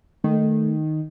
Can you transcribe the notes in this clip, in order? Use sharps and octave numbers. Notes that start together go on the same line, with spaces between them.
D#3 A3